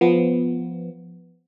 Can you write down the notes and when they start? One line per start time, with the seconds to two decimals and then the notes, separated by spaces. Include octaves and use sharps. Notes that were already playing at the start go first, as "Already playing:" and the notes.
0.01 F3 B3